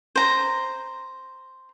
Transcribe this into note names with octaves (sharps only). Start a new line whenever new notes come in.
C5 A#5